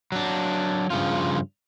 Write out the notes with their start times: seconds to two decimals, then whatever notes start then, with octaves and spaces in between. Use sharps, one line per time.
0.12 F#3 D4
0.90 G2 C#3 F3 F4